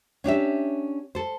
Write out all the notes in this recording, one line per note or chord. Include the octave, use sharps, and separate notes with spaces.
C#4 D4 G4 E5
A4 C5